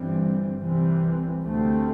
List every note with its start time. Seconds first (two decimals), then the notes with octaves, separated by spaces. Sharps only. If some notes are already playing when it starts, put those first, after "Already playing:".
Already playing: G1 G2 E3 G3 C4
0.62 C2 C3 E3 G3 C4
1.43 D2 C3 A3 C4